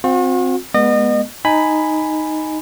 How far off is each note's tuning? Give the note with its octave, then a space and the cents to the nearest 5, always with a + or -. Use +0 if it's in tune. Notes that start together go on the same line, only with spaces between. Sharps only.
C4 +0 F#4 -45
G#3 +25 B3 -15 D#5 -35
D#4 +0 G#5 +0 B5 +10